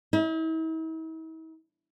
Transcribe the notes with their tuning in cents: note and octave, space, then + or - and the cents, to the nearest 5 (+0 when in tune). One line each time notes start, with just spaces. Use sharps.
E4 -45